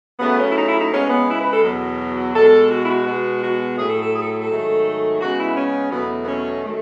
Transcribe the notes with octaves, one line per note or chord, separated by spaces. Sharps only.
C#3 F#3 A3 B3
C#4
E4
D#4
E4
D#4
C#3 G#3 B3 C#4
B3
E4
B4
A4
E2 B2 F#3
B2 G#3 B3 A4
F#4
E4
F#4
B2 G#3 B3
F#4
A2 F#3 A3 G#4
A4
A4
G#4
A4
A4
G#2 D#3 F#3 A3
C#3 G#3 B3 F#4
E4
C#4
E2 B2 F#3 A3 B3
B3
C#4
D#3 A3